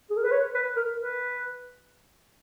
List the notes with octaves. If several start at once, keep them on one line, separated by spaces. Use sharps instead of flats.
G#4
A#4
B4
C#5
B4
A#4
B4